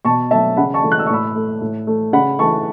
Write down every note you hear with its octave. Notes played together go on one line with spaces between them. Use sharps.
B2 A5 C#6
F#3 A3 E5 A5
C#3 F#5 B5
A5 C#6
E3 A3
F#6
E6
C#6
A2 B5 E6
A3
A2
A3
C#3 F#5 B5
E3 A3 A5 C#6